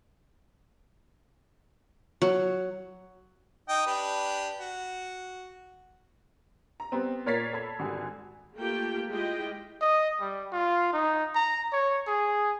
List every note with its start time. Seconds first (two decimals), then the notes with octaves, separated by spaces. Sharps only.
2.22 F#3
3.69 D#4 D#5 G5
3.86 D4 G4 B4
4.60 F#4
6.80 A#5
6.92 G3 B3 C4
7.26 A#2 A#4 C#5 A6 B6 C7
7.53 A4 B5 G#6
7.79 G#1 D3 G3 G#5
8.56 A3 A#3 F4 G4 G5
9.08 G#3 E4 F4 G4 D#5 G5
9.81 D#5
10.20 G3
10.52 F4
10.93 D#4
11.35 A#5
11.72 C#5
12.07 G#4